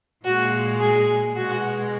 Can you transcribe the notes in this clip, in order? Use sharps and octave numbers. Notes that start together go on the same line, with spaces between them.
A#2 G#3 F#4
G#4
B2 G#3 F#4